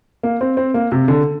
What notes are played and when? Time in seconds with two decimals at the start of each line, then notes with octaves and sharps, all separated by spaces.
0.23 A#3
0.41 C4
0.57 C4
0.74 A#3
0.92 C3
1.08 D3